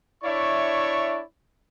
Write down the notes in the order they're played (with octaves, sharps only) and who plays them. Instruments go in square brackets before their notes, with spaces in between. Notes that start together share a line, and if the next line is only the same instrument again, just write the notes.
[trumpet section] D4 E4 C#5 D5 E5 C#6